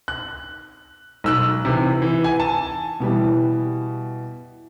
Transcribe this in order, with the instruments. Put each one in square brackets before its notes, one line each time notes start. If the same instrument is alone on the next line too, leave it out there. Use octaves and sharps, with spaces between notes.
[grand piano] F#6
B1 E6 F#6
C3 E3
E3
G#5
A5
B2 E3 G3